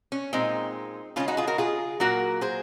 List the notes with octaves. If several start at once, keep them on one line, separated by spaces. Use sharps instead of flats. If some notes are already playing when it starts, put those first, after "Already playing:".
C#4
A#2 G#3 C4 D#4
C#3 G#3 C#4 F4
D#4 F#4
F4 G#4
F#4 A#4
F4 G#4
A#2 F#3 A#3 F#4 A#4
G#4 C5